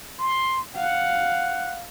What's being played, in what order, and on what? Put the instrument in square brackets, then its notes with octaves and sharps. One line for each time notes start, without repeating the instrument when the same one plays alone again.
[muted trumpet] C6
[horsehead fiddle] F5 [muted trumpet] F#5